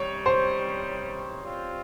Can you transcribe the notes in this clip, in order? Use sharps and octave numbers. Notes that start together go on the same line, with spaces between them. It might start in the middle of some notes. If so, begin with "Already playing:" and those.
Already playing: C3 D#3 G3 C#4 C#5
C5
G3 C4 F4